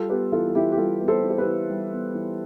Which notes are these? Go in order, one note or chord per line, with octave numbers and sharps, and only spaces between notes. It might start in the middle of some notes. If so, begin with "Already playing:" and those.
Already playing: G3 F4 A4
B3 G4 B4
E3 F4 A4
A4
E3 E4 G4
G4
G3 F4 A4
B3
A4 C5
E3
C5
G4 B4
E3
G3
B3
E3